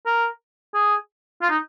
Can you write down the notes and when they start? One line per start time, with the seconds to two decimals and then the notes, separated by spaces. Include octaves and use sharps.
0.06 A#4
0.74 G#4
1.42 F4
1.50 D#4